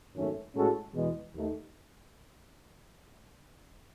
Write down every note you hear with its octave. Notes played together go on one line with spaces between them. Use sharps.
G#1 F#2 D#3 A3 C#4
A2 G#3 C#4 F#4 A4
E2 B2 G#3
D#2 D#3 A3